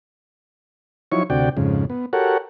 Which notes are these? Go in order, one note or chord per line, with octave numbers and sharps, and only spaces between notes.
F3 F#3 D#4 E4 C#5 C#6
D2 C3 F#4 D5 G5
F2 G#2 C#3
B3
F#4 G4 A4 A#4 C#5 F#5